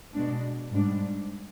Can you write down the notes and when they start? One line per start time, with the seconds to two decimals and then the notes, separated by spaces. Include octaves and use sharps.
0.14 B2 G#3 D4
0.71 G#2 G3 D4